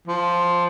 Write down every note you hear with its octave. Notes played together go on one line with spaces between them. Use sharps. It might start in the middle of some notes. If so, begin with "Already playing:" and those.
F3